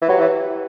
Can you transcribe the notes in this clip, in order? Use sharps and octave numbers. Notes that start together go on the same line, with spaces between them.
E3
F#3 G4 B4
E3